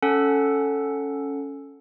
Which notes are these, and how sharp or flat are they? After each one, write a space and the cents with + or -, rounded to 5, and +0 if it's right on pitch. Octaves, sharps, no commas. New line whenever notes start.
C#4 +0 A4 +0 F#5 +0